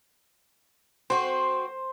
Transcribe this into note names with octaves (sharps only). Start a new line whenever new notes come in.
C4 F#4 C5